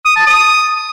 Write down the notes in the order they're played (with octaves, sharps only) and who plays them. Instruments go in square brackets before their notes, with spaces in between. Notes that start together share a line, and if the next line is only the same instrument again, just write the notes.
[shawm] D#6
A5
D#6